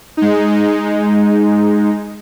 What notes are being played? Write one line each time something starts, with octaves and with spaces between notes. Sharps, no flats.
G#3 D#4